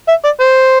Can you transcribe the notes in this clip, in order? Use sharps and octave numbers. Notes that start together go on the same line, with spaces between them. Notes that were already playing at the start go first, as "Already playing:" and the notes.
E5
D5
C5